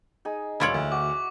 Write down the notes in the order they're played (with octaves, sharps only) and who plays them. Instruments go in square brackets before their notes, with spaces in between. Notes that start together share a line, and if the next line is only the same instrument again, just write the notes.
[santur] D#4 G#4
[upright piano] E1 D7 F#7 [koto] E4 F4 C#5 [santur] E5
[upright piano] D2
[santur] F#4 [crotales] D6